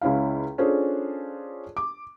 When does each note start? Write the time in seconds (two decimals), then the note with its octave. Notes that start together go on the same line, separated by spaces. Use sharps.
0.01 C#2 C#4 E4 F5
0.58 C#4 D4 F4 G#4 A4 C5
1.77 D6